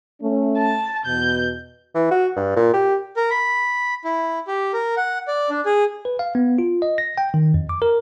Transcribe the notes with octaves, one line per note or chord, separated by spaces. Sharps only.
A3 C#4
A5
E2 B2 G6
E3
F#4
G2
A#2
G4
A#4
B5
E4
G4
A#4
F#5
D5
D4
G#4
B4
F5
B3
F4
D#5
A#6
G5
D#3
F2
D6
A#4